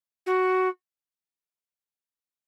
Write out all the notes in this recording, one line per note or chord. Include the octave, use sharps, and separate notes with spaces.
F#4